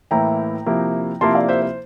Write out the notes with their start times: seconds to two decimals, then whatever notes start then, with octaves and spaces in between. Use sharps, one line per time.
0.11 A2 E3 A#3 E4 G5 A#5
0.66 C3 F3 A#3 E4
1.21 C3 F3 A#3 E4 A5 C6
1.35 D5 F5
1.48 C5 E5
1.62 C5